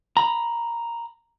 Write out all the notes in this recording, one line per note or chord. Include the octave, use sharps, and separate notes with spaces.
A#5 B5